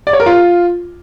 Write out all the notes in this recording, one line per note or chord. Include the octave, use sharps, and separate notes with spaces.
D5
C#5
A#4
F4